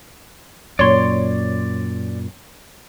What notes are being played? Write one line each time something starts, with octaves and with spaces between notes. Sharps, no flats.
F#2 A#2 C#5 D5 C6